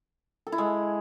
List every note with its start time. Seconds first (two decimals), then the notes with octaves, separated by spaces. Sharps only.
0.47 A4
0.52 E4
0.58 G#3